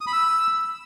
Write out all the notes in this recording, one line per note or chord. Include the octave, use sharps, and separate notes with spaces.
D#6
B5
E6